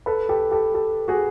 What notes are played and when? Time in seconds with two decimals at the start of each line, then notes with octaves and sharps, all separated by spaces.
0.06 A4 B4
0.29 G4 A4
0.51 G4 A4
0.74 G4 A4
1.08 F#4 G#4